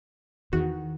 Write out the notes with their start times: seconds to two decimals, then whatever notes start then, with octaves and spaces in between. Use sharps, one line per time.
0.53 E2 D#3 F#4